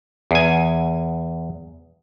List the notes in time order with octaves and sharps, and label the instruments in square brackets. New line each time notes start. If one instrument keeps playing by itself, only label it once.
[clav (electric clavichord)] E2 G#5